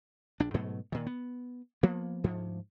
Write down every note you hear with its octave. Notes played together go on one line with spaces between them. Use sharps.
A#1 D4
G#2 B2 F#3 A3
A#2 D#3
B3
F3 A#3 B3
D2 G#2 F3